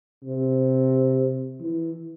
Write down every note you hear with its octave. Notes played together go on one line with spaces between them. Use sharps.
C3
E3